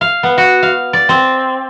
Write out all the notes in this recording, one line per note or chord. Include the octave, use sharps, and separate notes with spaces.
F5
B3
F#4
F5
D5
C4